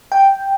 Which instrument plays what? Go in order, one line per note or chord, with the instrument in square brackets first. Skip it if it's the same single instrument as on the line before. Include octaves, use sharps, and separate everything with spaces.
[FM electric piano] G5